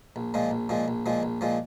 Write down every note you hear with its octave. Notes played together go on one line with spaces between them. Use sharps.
A#1
A#2 F3 G#3
A#1
A#2 F3 G#3
A#1
A#2 F3 G#3
A#1
A#2 F3 G#3